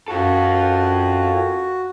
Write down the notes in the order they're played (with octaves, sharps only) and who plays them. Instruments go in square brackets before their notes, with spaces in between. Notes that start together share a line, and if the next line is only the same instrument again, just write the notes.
[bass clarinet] F#2 [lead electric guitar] F4 A4 [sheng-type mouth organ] F#4